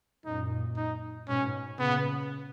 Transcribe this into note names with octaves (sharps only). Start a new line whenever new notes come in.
F#2 A#2 D#4
D#4
G#2 B2 C#4
A#2 C#3 B3